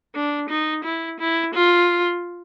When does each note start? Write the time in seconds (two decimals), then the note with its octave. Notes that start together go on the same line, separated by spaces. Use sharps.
0.15 D4
0.49 D#4
0.84 E4
1.20 E4
1.54 F4